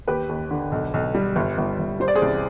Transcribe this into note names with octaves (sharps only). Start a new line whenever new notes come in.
D#2 G4 B4
D#2
D3
B1
B1
G3
G1
G1
G1
G3 C5
D5
G#4 C5
C2